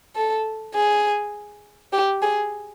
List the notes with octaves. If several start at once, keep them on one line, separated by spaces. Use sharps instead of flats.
A4
G#4
G4
G#4